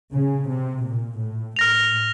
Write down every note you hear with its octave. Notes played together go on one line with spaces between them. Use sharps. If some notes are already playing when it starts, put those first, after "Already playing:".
C#3
C3
A#2
A2
A2 F6 A#6 F7